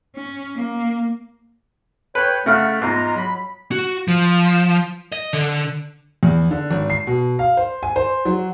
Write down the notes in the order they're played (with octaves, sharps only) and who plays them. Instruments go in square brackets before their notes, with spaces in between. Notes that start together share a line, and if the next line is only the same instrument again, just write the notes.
[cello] C#4
A#3
[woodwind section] A4 C#5 G5 [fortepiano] B4
[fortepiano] C#3 F#5 F6 [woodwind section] A3
[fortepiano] E2 G#2 [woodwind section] G#3 F4 A#5
[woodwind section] F#3 B5
[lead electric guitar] F#4
F3
D#5
D3
[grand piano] E2
D3
G#1
C7
B2
F5
C5
G#5
C5
F#3